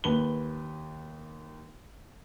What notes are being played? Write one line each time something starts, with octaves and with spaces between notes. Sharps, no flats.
D#2 B4 G7